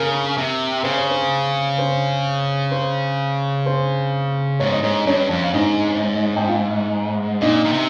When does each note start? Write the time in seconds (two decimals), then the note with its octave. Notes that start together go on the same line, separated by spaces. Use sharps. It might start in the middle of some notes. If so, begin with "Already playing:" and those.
Already playing: C#3 A#4
0.38 C3
0.84 C#3 C5
0.97 C#5
1.11 C5
1.78 C5
2.72 C5
3.66 C5
4.60 G#2 C#5
4.72 D#5
4.83 G#2 C#5
4.95 D#5
5.07 G2 C#4 C#5
5.30 F2
5.42 F5
5.53 G#2 D#4 D#5
6.36 G5
6.47 F4 F5
7.41 A#2 D#4 D#5
7.65 A#2
7.73 C3